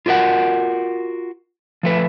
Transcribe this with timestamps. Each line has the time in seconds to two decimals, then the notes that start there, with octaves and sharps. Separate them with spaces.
0.06 F4 F#4 A#4 D5 F#5
1.83 F3 A3 B4